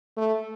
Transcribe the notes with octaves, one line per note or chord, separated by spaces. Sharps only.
A3